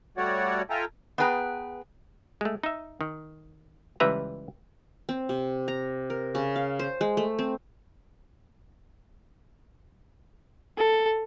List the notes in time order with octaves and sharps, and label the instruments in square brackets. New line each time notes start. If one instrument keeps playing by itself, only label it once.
[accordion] G3 A3 F#4 C#5 D5 F#5
F4 A4 E5 G5 G#5 A#5
[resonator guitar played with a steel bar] B3 D4 G#4 B4 G5 A#5
[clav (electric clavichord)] G#3 A3
D#4 E5
D#3
C#2 E3 G3 B4 E5 A#5
[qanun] C4
C3
A#5
A#4
C#3
F5
C5
G#3
A3
C4
[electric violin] A4